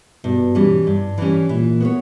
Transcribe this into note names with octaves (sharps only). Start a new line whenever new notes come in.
G2 B2
E3 G3 C#4
G2
E3 G3 C#4
A#2 E3
B3 F#4 C#5